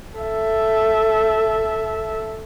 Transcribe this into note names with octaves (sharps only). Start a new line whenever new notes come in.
A4 E5